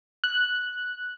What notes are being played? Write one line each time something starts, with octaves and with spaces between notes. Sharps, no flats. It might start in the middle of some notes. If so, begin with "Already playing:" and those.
F#6